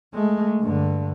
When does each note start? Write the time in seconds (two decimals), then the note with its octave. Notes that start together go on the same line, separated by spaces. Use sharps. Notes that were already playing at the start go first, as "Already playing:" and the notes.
0.14 G#3 A3
0.61 G2 D3